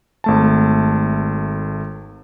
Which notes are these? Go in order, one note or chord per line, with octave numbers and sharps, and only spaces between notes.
G#1 A3 A5